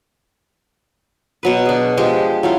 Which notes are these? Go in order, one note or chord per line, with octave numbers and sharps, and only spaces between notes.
B2 F#3 B4
D4 G#4
F3 G#3 G4
F#3 E4 F4